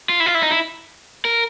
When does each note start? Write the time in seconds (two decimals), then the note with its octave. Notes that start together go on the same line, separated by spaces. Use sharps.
0.09 F4
0.20 E4
0.26 F4
0.35 E4
0.43 D#4
0.51 E4
1.25 A#4